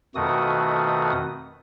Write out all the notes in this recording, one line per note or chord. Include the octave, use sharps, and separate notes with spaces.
F2 B2 D#3 A3 F#4 D#6